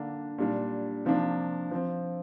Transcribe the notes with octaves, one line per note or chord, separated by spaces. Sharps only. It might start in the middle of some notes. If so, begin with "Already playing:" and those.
Already playing: D3 A#3 D4
A#2 G3 D4
C3 F3 A#3 D4
F3 C4